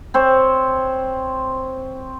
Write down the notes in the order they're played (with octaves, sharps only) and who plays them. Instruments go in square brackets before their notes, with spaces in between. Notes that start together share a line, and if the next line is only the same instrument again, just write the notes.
[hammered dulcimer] C4 C5 C#5